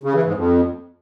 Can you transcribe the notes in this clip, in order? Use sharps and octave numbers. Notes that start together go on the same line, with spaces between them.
C#3
E3
G#2
F2